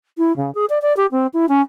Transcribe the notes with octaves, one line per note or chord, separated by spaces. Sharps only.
E4
C#3
G#4
D5
D5
G4
C4
E4
C#4